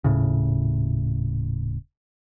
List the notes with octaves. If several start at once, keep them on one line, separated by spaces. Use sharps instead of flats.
D#1 A2 C#3